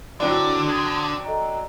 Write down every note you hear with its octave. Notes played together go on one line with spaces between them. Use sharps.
D3 F#3 C4 D4 E4
D#6 G#6 D#7
A4 D#5 A#5